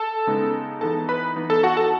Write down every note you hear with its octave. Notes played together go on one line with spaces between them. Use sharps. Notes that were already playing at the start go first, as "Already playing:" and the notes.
Already playing: A4 A5
C#3 G#3 B3 D#4
E3 B3 D#4 A4 A5
B4 B5
E3 B3 D#4
A4 A5
F#4 F#5
A4 A5